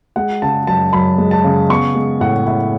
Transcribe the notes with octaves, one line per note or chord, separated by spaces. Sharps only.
G#3 F#5
C#3 A5
F#2 A5
F#2 B5
G#3
A5
C#3
B3 C#6
G#3
A2 F#5
E4 F#5